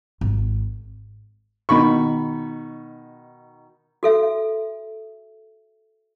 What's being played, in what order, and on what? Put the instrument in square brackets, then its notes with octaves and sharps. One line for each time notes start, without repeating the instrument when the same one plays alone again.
[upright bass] G#1
[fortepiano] B2 D#3 B5 C#6
[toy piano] F#4 A4 E5